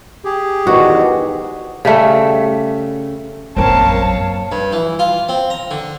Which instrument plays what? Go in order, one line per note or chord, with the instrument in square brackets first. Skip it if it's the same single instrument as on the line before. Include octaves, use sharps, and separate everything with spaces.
[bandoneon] G4 G#4
[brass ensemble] E2 G#2 D#3 [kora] F#4
[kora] C#3 G3 A3 E5
[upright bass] A#1 F#2 [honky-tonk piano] C4 A#4 [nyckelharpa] C#5 F5 [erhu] A5
[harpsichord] G2
E3
F4
C4
A#5
D3